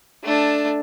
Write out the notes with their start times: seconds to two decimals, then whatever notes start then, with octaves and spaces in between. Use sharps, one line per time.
0.23 A3 D4